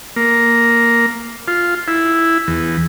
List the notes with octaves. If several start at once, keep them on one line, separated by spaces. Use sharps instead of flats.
A#3
F4
E4
E2